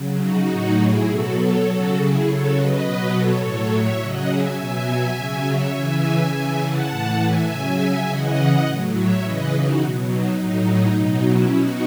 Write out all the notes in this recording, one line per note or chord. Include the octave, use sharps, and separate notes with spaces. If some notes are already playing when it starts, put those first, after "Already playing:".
Already playing: C#3 F#3
D#4 F#4
A2 F#3
E4 G#4
B2 F#3 F#4 A4
A4 C#5
C#3 F#3 F#4 A4
E4 G#4
C#3 F#3 A4 C#5
B4 D#5
B2 F#3
A4 C#5
A2 F#3 A4 C#5
C#5 E5
C#3 F#3 D#5 F#5
E5 G#5
B2 F#3 E5 G#5
C#3
F#3
C#5 E5
C#3 E3 E5 G#5
C#3 E3 E5 G#5
F#5 A5
A2 E3
E5 G#5
C#3 F#3
C#3 E3 D#5 F#5
A2 F#3
C#5 E5
C#3 E3 B4 D#5
D#4 F#4
B2 F#3
D#4
A2 F#3 D#4
B2 F#3 D#4
C#4 E4
B2 D#4 F#4